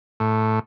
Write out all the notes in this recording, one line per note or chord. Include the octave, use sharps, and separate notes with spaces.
A2